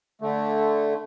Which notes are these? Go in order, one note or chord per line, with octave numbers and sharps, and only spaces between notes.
D3 A3